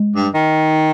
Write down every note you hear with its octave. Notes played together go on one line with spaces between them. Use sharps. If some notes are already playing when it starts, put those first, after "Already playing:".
Already playing: G#3
G2
D#3